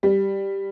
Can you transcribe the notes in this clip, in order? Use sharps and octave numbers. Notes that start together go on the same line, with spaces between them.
G3